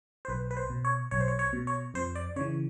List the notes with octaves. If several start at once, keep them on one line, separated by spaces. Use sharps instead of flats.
C5
B1 B4
B4
C5
B2
C#5
B1 C#5
C5
C#5
C#5
B2
C#5
F2 C5
D5
C#3 E3 C#5